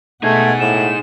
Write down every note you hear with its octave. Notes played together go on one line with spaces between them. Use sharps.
B2 A3 D#4 G#4 F#5 G#6
A2 E7